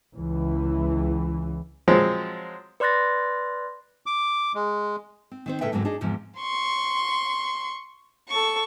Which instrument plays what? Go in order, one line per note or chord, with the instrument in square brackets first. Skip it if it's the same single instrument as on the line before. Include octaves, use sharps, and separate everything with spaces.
[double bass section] C#2 E3
[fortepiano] F3 F#3 G#3 C4
[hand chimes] B4 D5 C6 F#6 A6 A#6
[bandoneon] D6
G#3
[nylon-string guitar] C4
D#3 C4 C5
A2 C#3 A4 B4 E5 G5
F2 G#2 D3 F#3 A#3 C4
D4 D#4 G#4
E2 G#2 C3 F3
[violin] C6 C#6
A4 C#6